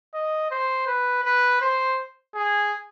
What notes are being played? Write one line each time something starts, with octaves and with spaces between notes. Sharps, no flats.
D#5
C5
B4
B4
C5
G#4